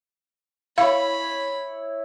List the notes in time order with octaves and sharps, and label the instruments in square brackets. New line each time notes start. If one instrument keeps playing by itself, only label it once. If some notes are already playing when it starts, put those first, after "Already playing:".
[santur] E4 C#5 [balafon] F5 [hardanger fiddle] B5